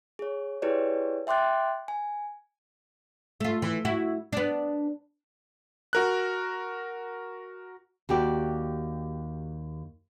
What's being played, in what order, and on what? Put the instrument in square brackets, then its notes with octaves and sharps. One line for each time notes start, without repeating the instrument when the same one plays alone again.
[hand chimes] G#4 C#5
E4 G4 G#4 B4 C#5 D5
E5 G5 C6 D6 F#6 A6
G#5
[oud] A3 F4
E3
E4 F#4
B3 D4
[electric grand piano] F#4 A#4 F#6
[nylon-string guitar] D#2 F#4 G4 D5